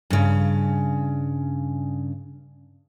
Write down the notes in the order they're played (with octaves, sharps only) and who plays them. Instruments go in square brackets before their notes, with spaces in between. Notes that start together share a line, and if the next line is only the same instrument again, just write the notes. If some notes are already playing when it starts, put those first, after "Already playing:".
[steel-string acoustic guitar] G2 C#3